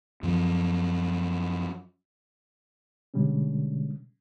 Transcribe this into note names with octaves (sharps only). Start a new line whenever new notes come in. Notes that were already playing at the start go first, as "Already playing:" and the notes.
F#2 F3
B2 D3 G3 G#3 C#4